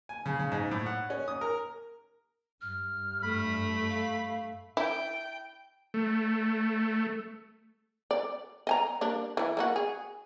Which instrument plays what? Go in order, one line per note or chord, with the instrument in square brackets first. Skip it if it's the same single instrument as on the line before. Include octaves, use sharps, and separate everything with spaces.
[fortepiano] G#5
C#3
C#3
G#2
A2
F#5
C#4
D#6
A#4
[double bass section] G2 [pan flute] F6
[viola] A3 [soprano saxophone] B5
[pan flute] F5
[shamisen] E4 [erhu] G5
[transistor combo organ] A3
[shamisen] D5
D#5 G#5 A#5
G3 A#3 D4
E3 E4
A#3 E4 F#4
G#4